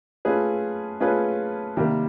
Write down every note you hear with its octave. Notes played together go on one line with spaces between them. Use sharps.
A3 C#4 F4 G#4 B4
A3 C#4 F4 G#4 B4
C3 D#3 G3 A#3